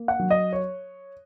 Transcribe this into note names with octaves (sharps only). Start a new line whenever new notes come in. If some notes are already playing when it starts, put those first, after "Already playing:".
Already playing: A#3
F#5
F#3
D#5
C#5